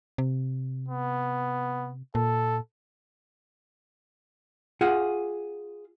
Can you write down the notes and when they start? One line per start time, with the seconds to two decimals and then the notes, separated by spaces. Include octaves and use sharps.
0.18 C3
0.88 B3
2.15 A#2 A4
4.81 F4 G#4 F#5